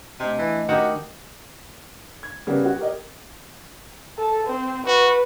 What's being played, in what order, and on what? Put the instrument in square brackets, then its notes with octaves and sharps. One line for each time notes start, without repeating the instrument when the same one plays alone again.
[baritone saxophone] C3 [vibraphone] A3 D4 D#5
[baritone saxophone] E3
[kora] D#3 D#4 G4 [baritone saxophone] F#4
[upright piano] G#6
C#3 G3 A#3 B3 G4
F#4
G4 A#4 D#5
[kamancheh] A4
C4
[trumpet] F#4 [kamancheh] B4